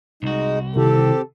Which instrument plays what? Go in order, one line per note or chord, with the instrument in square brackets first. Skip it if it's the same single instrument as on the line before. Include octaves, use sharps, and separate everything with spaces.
[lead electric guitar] C2 F#4 [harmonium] G#3 D#4
[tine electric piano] C3 D#3 E4 [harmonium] C4 G4 [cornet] A4